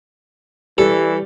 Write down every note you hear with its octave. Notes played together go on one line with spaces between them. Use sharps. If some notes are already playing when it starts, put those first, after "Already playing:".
E3 G3 G4 A4